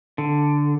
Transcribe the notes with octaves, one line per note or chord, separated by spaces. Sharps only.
D3